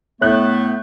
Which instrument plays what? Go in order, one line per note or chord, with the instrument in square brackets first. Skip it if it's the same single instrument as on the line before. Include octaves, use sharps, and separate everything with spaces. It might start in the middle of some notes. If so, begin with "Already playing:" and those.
[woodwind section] A2 A3 B3 [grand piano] C#5 F#6 G6